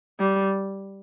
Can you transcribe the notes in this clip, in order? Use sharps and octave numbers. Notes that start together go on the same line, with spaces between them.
G3